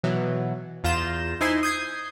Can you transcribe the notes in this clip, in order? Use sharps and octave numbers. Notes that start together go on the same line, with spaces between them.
B2 E3 F#3
E2 F4 A#5 G6 E7
D#4 E4 C5 G#5 C6
D#6 G6 G#6 C7